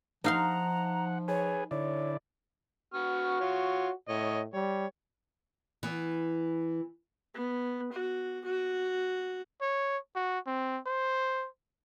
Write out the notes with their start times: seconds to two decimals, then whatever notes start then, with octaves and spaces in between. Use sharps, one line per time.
0.24 F3 D#4 F5 F#5 A#5 C6
1.28 G#4 B4 C#5 G#5
1.71 D3 E4 C#5 D5
2.94 B3 F#4 C#6 F6
3.41 F4 C#5
4.09 A2 C#5 D#5
4.54 G3 C#5
5.83 E3 B3
7.34 B3
7.93 F#4
8.45 F#4
9.61 C#5
10.15 F#4
10.46 C4
10.86 C5